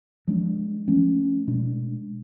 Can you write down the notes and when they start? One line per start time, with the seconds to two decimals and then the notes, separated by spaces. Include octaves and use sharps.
0.28 F3 G#3 D4
0.88 F3 A3 C#4
1.48 B2 G#3 D4